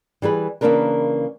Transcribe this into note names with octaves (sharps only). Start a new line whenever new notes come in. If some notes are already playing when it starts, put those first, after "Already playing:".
E3 G3 G#4 B4
C#3 E3 A#3 D4 A#4 B4